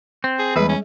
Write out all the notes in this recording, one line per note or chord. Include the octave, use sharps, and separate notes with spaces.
C4
G#4
E2 G3 G#3 G#4 B4
C#4